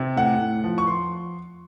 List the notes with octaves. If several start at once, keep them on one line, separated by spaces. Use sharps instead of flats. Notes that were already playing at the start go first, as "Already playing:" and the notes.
Already playing: C3
A2 F#5
A2
F3
C#6
F3 C6